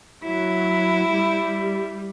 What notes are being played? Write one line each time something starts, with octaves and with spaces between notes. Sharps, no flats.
F#3 E4
G3